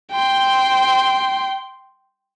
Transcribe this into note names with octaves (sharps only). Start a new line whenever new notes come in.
G5 C6